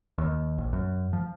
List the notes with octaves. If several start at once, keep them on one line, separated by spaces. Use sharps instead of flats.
D#2
A#1
F#2
F3